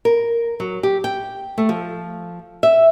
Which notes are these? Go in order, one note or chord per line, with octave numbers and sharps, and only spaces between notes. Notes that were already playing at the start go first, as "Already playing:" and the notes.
A#4
F#3
G4
G5
A3
F3
E5